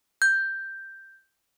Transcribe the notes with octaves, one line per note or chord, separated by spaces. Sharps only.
G6